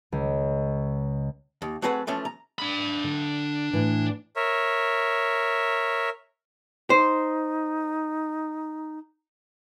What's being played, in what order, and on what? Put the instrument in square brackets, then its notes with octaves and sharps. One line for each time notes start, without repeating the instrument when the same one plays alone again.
[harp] C#2
[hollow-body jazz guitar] D#2
F#3 A3 C4 G#4 B4 F#5
E3 F3 A3 C#4
A#5
[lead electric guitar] D4 B5
[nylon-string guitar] D3
A2 E3
[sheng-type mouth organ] A#4 C#5 E5
[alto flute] D#4 [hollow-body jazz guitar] C5